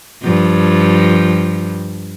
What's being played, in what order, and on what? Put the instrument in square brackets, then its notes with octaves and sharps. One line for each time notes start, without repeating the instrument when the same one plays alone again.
[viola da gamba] G2 F3